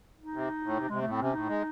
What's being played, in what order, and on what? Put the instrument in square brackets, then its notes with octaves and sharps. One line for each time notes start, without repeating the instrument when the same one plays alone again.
[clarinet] D#4
[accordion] C3
A2
C3
[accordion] C3 [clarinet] G#3
[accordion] A2 [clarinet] A3
[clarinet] C4
[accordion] C3 [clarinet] C#4
[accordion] A2 [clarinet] D#4
[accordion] G#3